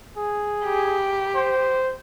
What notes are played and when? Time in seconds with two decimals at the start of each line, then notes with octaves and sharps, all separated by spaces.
0.17 G#4
0.65 G4
1.35 C5